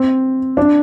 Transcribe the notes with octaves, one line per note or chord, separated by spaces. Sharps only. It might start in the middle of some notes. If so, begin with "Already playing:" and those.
Already playing: C4
D4